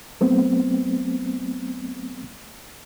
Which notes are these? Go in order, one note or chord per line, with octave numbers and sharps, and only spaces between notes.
F#3 A3 B3 C4